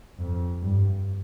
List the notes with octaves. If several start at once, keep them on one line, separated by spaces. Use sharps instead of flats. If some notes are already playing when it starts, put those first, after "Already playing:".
F2
G2